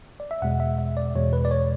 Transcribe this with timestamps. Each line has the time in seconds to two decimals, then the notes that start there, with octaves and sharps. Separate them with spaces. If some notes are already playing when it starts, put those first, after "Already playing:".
0.20 D5
0.31 E5
0.42 E2 B2 G#3 F#5
0.60 E5
0.78 E5
0.97 D5
1.15 E2 B2 G#3 C#5
1.33 B4
1.45 D5
1.51 C#5